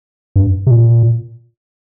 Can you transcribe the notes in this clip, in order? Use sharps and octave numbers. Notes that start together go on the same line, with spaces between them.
G2
C3
A#2